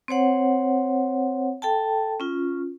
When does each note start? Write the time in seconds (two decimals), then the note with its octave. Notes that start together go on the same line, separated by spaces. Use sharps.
0.08 C4 C5 C#5 F#5
1.62 A4 G5 A5
2.20 C#4 F4